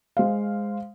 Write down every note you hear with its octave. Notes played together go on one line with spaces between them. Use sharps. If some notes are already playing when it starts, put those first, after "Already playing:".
G#3 C5 F5